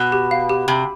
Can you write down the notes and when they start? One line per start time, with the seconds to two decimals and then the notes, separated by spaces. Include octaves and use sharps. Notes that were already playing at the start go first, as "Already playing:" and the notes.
Already playing: B2
0.12 G4
0.31 F5
0.49 G4
0.68 C3 B5